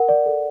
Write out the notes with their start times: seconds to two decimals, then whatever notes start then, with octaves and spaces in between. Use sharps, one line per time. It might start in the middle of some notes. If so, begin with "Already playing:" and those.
Already playing: A#4 F#5
0.09 D5
0.26 A4